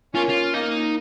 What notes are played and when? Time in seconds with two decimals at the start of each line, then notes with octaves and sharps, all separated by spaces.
0.15 A#3 C#4 F4
0.29 F4
0.54 A#3 D#4